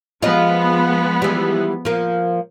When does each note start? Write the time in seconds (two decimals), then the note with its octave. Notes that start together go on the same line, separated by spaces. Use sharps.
0.23 F3 G#3 B3 F4 D#5
1.22 E3 G3
1.85 F3 A#3